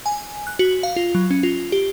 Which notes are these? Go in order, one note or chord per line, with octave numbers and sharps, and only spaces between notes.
G#5
F#6
F#4
F5
F4
F#3
C#4
F4
G4